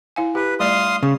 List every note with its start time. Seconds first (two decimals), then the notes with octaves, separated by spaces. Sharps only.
0.16 E4 F5 G#5
0.35 G4 B4
0.60 G3 A3 D5 F5 C6 D#6
1.03 C#3